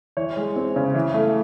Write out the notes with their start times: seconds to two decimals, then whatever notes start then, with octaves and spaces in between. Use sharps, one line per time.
0.17 E3 C#5
0.37 G#3
0.56 C4
0.76 C#3
0.94 E3
1.14 A3